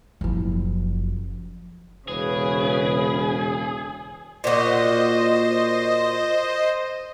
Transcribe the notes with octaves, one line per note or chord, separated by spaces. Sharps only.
F#1 F3
E1 C#3 G#4 B4
A#2 F#4 C5 D#5